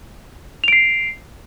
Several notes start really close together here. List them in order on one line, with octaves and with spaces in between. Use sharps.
F7 D7 C7